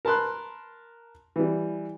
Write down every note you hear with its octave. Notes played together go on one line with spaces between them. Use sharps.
A#4 A5 B5 C6 F#6
E3 G3